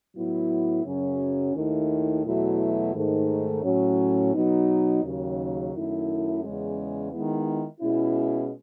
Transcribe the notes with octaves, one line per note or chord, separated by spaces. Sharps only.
A2 F#3 B3 E4
F#2 C#3 F#3 C#4
D#2 D#3 A3 E4
E2 B2 F#3 A3 E4
G#2 D#3 A3
A2 F#3 C#4
B2 F#3 B3 D#4
D#2 C#3 F#3
F#2 D#3 A3 E4
E2 C#3 G#3 C#4
D#3 G#3 B3 E4
B2 G#3 C#4 E4